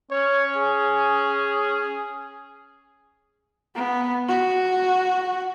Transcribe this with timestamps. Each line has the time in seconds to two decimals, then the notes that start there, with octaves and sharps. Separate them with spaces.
0.11 C#4 C#5
0.56 G#4
3.75 B3
4.29 F#4